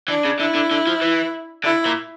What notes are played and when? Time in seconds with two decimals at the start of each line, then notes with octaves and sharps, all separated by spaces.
0.08 E3 D4
0.25 C#3
0.40 D3 E4
0.55 D3
0.71 D3
0.87 F3
1.02 E3
1.64 D3 E4
1.86 A#2